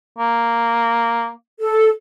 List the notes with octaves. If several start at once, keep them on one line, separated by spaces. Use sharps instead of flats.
A#3
A4